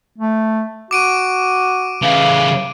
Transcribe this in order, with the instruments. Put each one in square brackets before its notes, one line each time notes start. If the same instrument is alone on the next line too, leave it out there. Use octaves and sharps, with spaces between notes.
[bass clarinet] A3
[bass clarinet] F#4 [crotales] D6 D7 D#7
[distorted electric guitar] C#3 E3 [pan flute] F5